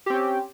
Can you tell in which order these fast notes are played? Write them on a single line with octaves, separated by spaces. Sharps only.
G4 C4 C#4